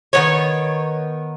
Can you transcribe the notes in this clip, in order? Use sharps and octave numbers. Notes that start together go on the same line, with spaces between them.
D#3 G#3 B3 C#5